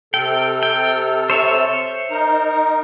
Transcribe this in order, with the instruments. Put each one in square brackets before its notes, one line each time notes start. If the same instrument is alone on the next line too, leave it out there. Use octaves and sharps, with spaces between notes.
[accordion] C3 A4 F6 [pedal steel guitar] G5
[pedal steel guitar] G5
C5 C#5 E5
[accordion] D#4 A#4